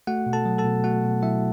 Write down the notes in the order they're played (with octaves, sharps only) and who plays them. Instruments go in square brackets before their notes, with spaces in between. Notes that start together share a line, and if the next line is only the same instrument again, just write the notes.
[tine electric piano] A3 F#4 F#5
B2
A4 A5
F#3
A4 A5
B2
A3 F#4 F#5
B2
F#3 E4 E5